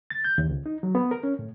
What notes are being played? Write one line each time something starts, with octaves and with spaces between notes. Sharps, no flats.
A6
G6
D#2
C#2
D#4
F#3
B3
A#4
C#4
A2